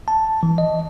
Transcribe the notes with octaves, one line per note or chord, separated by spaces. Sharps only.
A5
E3
D#5